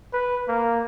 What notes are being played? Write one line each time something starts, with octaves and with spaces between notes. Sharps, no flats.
B4
A#3